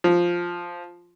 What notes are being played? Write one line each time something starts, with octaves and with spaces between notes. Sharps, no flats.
F3